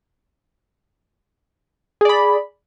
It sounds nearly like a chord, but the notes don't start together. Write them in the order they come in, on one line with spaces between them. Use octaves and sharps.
G#4 D5 B5